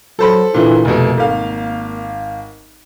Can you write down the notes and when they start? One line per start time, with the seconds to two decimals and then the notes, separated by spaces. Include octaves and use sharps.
0.19 F#3 A4 C5 B5
0.54 A#2 D3 E3 E4
0.85 F1 B2 A#3
1.17 G#1 F5